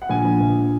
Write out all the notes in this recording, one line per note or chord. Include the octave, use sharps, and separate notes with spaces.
F#5
A#1 G#5
A#1
A#1